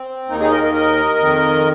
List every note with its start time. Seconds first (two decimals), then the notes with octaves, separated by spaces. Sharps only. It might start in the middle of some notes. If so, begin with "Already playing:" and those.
Already playing: C4
0.29 D#2 D#3 A#3 D#4
0.40 D#4 G#4
0.51 A#4 D#5
0.63 A#4 D#5
0.73 A#4 D#5
1.18 F2 D#3